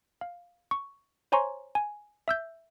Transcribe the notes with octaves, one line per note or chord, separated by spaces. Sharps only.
F5
C#6
C5 C#5 G#5 A#5 C6 C#6
G#5
E5 E6 G6